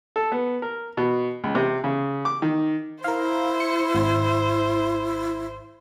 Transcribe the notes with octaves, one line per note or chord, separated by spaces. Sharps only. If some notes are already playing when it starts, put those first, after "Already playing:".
A4
B3
A#4
B2
C#2
C3
C#3
D6
D#3
E4 A#4 C5 F5
C#7
G#1